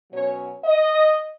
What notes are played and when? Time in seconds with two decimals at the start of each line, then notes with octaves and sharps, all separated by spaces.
0.10 B2 F#3 C#4 C#5
0.65 D#5